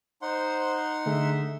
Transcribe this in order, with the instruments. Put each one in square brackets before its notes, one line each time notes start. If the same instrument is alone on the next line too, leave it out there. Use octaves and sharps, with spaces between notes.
[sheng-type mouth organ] D#4 F#5 C6 [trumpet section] C5
[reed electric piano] D3 A3 G#4 [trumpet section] E5